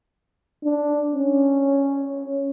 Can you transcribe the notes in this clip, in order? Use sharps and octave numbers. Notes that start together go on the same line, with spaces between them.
D4
C#4